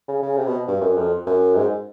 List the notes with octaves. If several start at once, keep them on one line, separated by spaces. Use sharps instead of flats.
C#3
C#3
C3
B2
G2
F#2
F2
F#2
G#2